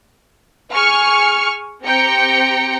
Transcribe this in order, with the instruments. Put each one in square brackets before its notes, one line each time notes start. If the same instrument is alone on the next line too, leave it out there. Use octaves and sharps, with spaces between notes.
[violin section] G#4 G#5 C#6 F6 C#7
C4 G4 G5 A#5 C#7